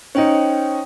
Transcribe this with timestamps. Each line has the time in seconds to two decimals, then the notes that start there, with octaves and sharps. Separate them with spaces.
0.15 C#4 D#4 C5 C#5 G5